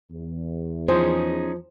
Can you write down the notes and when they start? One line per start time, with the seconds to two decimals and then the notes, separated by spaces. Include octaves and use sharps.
0.11 E2
0.88 F3 C#4 D#4 G#4 C5